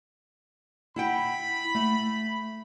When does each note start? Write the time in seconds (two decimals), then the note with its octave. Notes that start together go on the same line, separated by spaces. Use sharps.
0.96 E4 F#5 G5 B5
1.74 A3